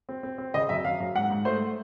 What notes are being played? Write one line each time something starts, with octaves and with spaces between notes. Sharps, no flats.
C4
C4
C4
C#3 D#5
F#2 E5
F#2 F5
F#2
G#2 F#5
G#2
A3 C5